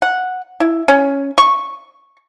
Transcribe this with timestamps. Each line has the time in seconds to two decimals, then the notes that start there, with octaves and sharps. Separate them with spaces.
0.02 F#5
0.60 E4
0.88 C#4
1.38 C#6